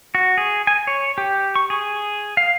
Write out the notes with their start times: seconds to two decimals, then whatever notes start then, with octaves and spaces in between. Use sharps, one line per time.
0.15 F#4
0.38 G#4
0.67 G#5
0.87 C#5
1.18 G4
1.56 C#6
1.70 G#4
2.37 F5